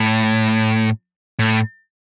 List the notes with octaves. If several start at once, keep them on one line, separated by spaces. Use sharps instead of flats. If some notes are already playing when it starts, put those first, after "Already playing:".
Already playing: A2
A2